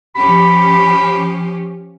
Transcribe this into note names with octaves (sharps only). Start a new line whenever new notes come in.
F3 C#4 G4 B5